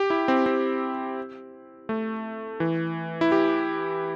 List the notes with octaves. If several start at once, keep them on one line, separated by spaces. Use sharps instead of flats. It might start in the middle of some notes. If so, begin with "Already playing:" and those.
Already playing: G4
E4
C4
C4
A3
E3
E4
G4